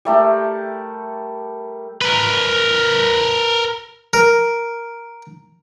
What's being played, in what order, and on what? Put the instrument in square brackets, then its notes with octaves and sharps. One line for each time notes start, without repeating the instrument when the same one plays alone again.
[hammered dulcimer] G3 A3 G4 A#4
[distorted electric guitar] A#4 B4
[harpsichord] A#4